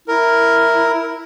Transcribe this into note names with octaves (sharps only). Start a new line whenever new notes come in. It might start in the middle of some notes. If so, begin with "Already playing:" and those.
E4 A#4